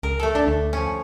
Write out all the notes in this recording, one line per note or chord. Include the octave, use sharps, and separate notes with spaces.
C#2 A#4
A3 A4
D4
D2
F3 C#4